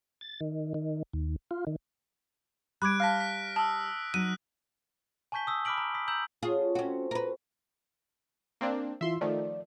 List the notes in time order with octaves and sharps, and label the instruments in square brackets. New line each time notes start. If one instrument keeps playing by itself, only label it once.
[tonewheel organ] A6
D#3
D#3
D#2
F4
D#3
[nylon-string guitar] G3 [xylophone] B5 D6 G#6 [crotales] F#6 D7
[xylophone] F5 A5 [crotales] F6 A#6 B6
[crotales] B6
[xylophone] A5 [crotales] D#6 E6
[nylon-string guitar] F#3 D#4 [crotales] F#6 [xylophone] D#7
[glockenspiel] G#5 A5 C#6 G6 B6 G7
D#6 E6 B6
B5 D6 F6 B6 D7 F#7
A#5
D#6 B6
A#5 D#6 E6 G6 F#7
[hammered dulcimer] C#4 F#4 A4 [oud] F4 G#4
[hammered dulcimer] C4 C5 [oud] C#4 F#4
[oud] A#4 B4
[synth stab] A#3 C4 D4
[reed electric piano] E3 E4 F4 [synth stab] E5 C6
[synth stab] D#3 F3 A3 [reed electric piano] D5